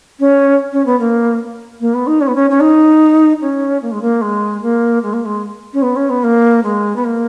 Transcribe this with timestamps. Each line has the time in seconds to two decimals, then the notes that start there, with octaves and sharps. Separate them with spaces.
0.19 C#4
0.72 C#4
0.86 B3
1.00 A#3
1.80 A#3
1.94 B3
2.07 D#4
2.21 C#4
2.27 B3
2.35 C#4
2.50 C#4
2.60 D#4
3.42 C#4
3.82 A#3
3.91 G#3
4.01 A#3
4.21 G#3
4.62 A#3
5.03 G#3
5.13 A#3
5.25 G#3
5.73 C#4
5.82 B3
5.96 C#4
6.09 B3
6.23 A#3
6.63 G#3
6.96 B3
7.04 A#3